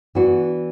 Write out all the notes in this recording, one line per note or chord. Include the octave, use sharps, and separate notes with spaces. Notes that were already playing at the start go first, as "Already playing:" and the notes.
E3 B3 D4 F#4